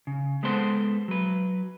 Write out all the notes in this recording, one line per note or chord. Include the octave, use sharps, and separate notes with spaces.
C#3
G#3 B3 A4 C5
F#3 B4